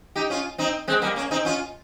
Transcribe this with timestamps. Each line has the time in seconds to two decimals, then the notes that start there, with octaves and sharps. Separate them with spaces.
0.16 D#4 G4
0.30 C#4 F4
0.58 C4 D#4
0.88 G#3 C4
1.02 G3 A#3
1.16 A#3 C#4
1.31 C4 D#4
1.45 C#4 F4